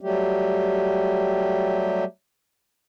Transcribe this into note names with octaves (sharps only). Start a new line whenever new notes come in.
F#3 G3 A3 G4